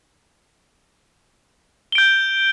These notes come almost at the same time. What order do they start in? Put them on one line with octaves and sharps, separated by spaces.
G7 D7 G6